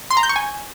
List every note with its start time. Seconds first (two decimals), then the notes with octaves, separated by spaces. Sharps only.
0.11 C6
0.17 A#5
0.23 G6
0.29 C#6
0.36 G#5